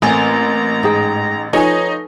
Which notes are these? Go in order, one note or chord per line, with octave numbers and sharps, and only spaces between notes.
A1 A3 A#3 C4 G#5 A#5
G#2 D#4 G#4 G5
F3 D#4 A4 B4 C#5 G#5